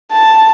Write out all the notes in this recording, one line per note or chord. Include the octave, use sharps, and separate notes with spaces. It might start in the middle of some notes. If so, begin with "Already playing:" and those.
A5